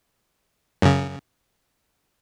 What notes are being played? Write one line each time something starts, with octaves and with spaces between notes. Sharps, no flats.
F#2 C#3